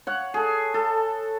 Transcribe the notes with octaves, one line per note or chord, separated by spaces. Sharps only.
C#5 F#5
G#4 A4
A4